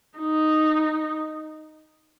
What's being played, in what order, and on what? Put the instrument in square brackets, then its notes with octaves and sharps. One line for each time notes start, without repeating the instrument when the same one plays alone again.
[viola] D#4